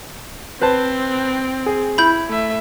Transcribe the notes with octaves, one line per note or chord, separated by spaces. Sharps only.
C4 B4 C5 A5
G#4
E4 B5 G6
A3 E5